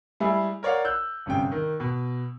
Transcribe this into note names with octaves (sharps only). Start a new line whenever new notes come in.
G3 G#3 E4 G#4
A#4 C#5 D5 F5 F#5
E6 F#6 G6
G1 F#2 C3 G5
D#3
B2